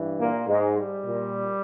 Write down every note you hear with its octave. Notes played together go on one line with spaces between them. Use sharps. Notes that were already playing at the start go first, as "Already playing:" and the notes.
Already playing: G2 E3
A#2 A#3
G#2 G#3
G3
A#2